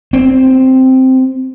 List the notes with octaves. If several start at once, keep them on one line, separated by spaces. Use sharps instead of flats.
C4